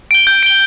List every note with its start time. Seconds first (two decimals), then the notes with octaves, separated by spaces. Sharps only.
0.11 D7 G7
0.27 G6
0.43 D7 G7